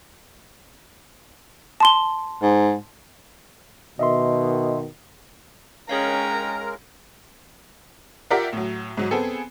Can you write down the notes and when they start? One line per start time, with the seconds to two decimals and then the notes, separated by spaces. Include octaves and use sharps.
1.80 A5 C6 G7
2.42 G#2
3.99 B2 D#3 D#5 E5 C6
5.89 G#3 C#4 G#4 A#4 C#5 F5 G5 A#5
8.30 F4 G4 A#4 D5 E5 F#5
8.53 A2 F#3
8.97 G#2 F#3
9.11 B3 C4 G#4 A4